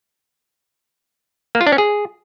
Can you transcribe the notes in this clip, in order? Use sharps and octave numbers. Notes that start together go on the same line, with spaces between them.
A#3
F4
D4
C#4
G#4